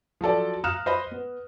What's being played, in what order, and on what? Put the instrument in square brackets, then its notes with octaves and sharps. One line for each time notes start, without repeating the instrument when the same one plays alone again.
[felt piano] F3 F#3 A4 D5
F5 A#5 D#6 F6 F#6 E7
C5 D#5 B5
B3